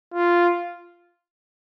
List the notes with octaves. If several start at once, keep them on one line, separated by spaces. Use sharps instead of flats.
F4